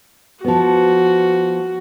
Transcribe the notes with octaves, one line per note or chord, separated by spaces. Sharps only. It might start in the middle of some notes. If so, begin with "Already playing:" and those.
F3 B3 F#4